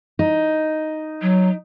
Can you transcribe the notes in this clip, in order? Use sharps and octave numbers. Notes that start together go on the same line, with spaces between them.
D#4
F#3